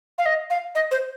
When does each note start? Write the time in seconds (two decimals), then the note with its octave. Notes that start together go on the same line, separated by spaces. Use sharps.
0.18 F5
0.26 D#5
0.50 F5
0.75 D#5
0.91 C5